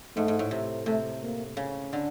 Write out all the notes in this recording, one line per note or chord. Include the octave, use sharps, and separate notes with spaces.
G#2 A3
G#2
A2
C3
C3 A3
A#3
C#3
D3